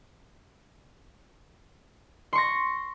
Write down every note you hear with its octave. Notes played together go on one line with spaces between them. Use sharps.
C6 C#6 A#6